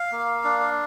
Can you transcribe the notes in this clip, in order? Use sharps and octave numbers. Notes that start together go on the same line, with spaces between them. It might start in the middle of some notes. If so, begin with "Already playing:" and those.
Already playing: F5
A#3
D4